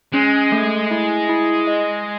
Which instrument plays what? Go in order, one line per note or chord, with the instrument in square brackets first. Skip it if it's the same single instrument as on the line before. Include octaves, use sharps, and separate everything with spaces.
[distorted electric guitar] G#3 [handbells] C#4
[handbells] A3
E4
E4
D#5